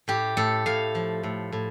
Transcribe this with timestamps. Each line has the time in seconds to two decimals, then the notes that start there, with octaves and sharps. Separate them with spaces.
0.08 A2 G4
0.37 A2 A4
0.66 A2 F5
0.95 F3
1.23 A2
1.52 A2